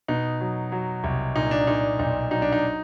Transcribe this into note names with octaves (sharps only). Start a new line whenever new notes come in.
B2 D#4
F#3
F#3
C2
A#2 D#4
D4
A#2 D#4
B1 D#4
F#3 D#4
D4
D#4